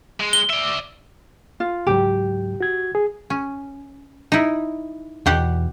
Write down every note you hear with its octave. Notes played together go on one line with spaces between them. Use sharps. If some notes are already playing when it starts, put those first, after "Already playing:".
G#3
G7
D5 E5
F4
C#2 G#2 F#3 G4
F#4 G#6
G#4
C#4
D#4 E4
E2 B2 G4 F#5